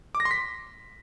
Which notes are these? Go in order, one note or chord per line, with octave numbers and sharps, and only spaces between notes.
D6
A#6
C6
B6